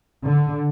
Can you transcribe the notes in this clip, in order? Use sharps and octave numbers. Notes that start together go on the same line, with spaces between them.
D3